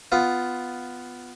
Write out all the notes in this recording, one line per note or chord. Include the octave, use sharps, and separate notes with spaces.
B3 F4